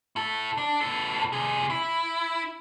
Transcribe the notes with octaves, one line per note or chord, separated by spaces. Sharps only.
E4 A4
D4
B3 A4
C3 G#4
E4